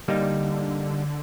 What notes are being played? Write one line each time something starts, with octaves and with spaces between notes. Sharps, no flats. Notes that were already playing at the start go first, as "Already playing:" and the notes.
D3 G3 A#3 D#4